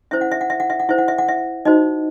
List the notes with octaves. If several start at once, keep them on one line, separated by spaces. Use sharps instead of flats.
C#4 E4 C5 E5
F#5
E5
F#5
E5
F#5
E5
F#5
E4 C5 E5
F#5
E5
F#5
E5
D#4 F#4 C5 D#5